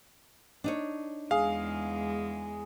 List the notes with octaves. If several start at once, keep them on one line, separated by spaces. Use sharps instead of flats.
D4 D#4 C#5
E2 G#3 G#4 F5